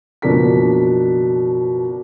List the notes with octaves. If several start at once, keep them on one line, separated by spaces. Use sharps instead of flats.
F#1 B2 F3 D4 A#4 B6